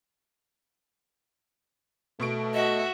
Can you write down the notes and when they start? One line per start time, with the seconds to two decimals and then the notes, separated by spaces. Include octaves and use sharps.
2.20 B2 A3 C#6 D7
2.54 F#4 D#5 E5